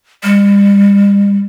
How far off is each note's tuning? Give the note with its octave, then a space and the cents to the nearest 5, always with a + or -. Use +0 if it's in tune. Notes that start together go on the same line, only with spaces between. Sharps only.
G3 +40